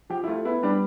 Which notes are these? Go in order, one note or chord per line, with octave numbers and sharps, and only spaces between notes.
F3 G4
E4
A3 F4
B3 E4
G3 D4